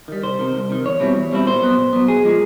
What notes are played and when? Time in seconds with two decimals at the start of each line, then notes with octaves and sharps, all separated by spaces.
0.08 D#3 G3
0.23 C2 C5
0.39 C3 D#3
0.55 C2
0.70 C3 D#3
0.85 E2 C#5
1.00 B2 G3 C4 E4
1.16 E2
1.31 B2 G3 C4 E4
1.46 A#2 C5
1.62 F#3 B3
1.77 A#2
1.93 F#3 B3
2.08 B1 G#4
2.24 A#2 F3 G#3